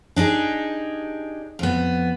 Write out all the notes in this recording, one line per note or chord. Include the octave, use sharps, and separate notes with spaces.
D4 D#4 G4 G#4
F2 B3